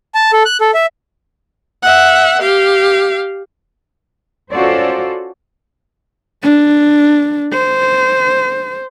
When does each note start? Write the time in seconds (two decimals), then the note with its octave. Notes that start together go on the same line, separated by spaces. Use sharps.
0.15 A5
0.33 A4
0.45 F#6
0.61 A4
0.74 E5
1.83 E5 F#5
2.42 G4 F5
4.51 C#4 F4 F#4 A4 C5 D5
6.43 D4
7.53 C5